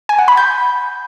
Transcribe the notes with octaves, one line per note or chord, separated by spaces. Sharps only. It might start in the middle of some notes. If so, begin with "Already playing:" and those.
G#5
F#5
B5
G6